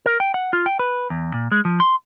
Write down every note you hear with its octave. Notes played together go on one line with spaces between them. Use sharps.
A#4
G5
F#5
F4
G5
B4
E2
A#2
G#3
F3
C6